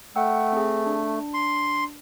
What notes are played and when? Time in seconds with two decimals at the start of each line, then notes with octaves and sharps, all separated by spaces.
0.16 A3 F#5 G5 E6
0.52 C4 G#4
0.86 D4
1.34 C6